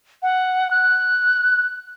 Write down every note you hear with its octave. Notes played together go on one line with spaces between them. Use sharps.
F#5
F#6